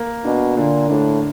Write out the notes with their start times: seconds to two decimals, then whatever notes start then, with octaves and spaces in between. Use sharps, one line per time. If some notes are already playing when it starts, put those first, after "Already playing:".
Already playing: A#3
0.24 B2 D4
0.57 A#2 D3
0.90 A2 D4